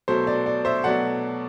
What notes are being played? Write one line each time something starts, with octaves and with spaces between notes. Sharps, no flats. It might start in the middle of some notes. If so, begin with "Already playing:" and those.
B2 F#3 A3 C5
D5
D5
C5 E5
B2 F#3 A3 D5 F#5